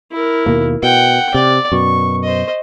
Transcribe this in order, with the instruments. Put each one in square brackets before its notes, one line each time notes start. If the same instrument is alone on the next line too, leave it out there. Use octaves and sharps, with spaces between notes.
[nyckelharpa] E4 A#4
[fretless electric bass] D#2 B2 A#3
[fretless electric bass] B2 [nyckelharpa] F#5 G5
[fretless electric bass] C3 [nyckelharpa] D5
[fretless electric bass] F#2 B2 [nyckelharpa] C#6
[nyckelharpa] C5 D#5